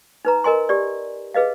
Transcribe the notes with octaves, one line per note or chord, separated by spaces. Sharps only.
D#4 B4 A#5
A#4 D#5 G#5 C6
G4 D5
G#4 B4 D#5 F5